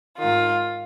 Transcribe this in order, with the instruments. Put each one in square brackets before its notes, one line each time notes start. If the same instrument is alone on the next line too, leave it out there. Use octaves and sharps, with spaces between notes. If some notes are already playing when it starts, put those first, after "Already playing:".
[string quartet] G#2 D#3 F4